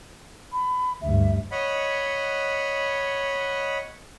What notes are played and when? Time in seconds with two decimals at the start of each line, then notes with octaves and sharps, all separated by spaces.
0.52 B5
1.02 D2 G2 E5
1.51 C#5 D#5 F#5 B5